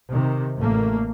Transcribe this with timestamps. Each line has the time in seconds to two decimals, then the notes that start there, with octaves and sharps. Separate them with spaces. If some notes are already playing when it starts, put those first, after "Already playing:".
0.11 C3 D#3
0.57 A1 A3 A#3